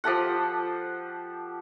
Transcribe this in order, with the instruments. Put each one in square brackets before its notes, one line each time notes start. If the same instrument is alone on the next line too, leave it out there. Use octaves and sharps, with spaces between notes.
[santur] F3 G4 A4 F#5